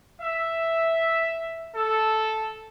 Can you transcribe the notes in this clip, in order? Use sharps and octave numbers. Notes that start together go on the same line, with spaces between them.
E5
A4